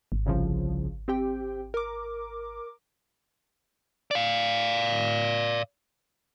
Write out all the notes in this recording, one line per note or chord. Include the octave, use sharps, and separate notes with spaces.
G#1
C2 C#3 F3
C4 G4 G5
A#4 D6
D5 F5